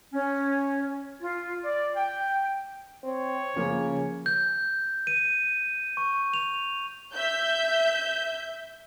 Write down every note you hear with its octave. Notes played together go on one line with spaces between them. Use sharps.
C#4
F4
D5
G5
C4 C#5
C#3 F3 A#3 C#4
G6
D#7
C#6
F7
E5 G6